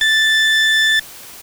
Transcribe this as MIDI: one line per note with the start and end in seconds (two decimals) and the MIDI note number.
0.01 0.99 93